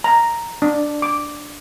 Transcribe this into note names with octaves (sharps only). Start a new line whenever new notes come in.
A#5
D4
D6